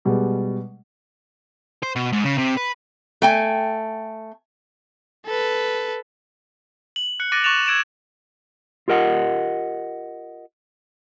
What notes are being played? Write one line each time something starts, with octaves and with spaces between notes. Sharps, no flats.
B2 G3 G#3
C5
B2
G#2
C#3
C3
B4
A3 G5 G#5
A4 B4
F#7
F#6 C#7
D6 F#6 A6 A#6 D7 D#7
C#6 D6 F#6 A6 E7 F7
E6 G#6 D7 E7 F#7
F4 G4 A#4 D#5 F#5